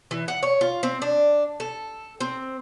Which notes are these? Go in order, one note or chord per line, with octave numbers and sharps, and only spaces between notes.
E3
F#5
C#5
F4
C4
D4
A4
C4